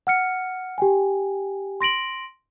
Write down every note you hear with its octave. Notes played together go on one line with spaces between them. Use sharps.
F#5 F6 C#7
G4 G5 G#5
C6 A#6 D7 F#7